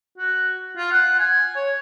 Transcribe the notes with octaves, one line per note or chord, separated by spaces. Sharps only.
F#4
F4
F#5
G#5
C#5